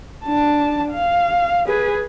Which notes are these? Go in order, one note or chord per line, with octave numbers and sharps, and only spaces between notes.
D4 A5
F5
G#4 B4